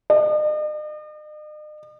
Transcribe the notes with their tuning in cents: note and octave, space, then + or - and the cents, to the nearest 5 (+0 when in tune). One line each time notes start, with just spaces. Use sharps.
D#5 -45